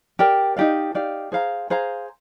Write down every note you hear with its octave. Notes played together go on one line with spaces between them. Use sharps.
G4 A#4 D5 G5
D#4 G4 D5 F5
D#4 G4 D5 F5
G#4 C5 F5 A#5
G#4 C5 F5 A#5